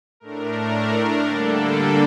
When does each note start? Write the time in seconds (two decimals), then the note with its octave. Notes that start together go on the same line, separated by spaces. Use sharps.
0.20 A2 A3 D4 A#4
1.25 D3 G3 A#3 D4 A4